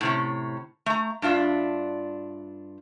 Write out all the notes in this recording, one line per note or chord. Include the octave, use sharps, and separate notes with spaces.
A2 C3 C#4
A3 A#5
G2 D4 F4 E5